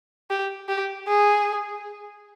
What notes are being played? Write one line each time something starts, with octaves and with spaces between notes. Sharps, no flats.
G4
G4
G#4